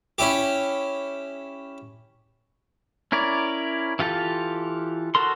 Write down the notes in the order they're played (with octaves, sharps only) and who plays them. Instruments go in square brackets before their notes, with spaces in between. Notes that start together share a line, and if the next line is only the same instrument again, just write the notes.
[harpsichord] C#4 E4 G4
[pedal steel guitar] C#4 E4 A#4 C#5 D5
E3 F4 G4 A4 F5
F#4 A4 A#4 C6